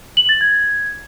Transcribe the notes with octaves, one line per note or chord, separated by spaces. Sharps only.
F#7
A6
G#6